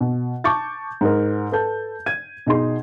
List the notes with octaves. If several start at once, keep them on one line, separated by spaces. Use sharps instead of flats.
B2
A5 C#6 D6 G6 A6
G#2 A#4
A4 B4 A5 G6
G#6 D#7
B2 D#4 G#4 C6